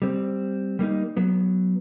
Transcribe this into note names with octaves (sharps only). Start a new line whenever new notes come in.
G3 C4
G3 A#3 C4 D#4
F#3 B3